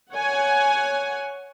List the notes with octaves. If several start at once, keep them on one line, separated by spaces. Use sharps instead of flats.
C#5 F#5 G#5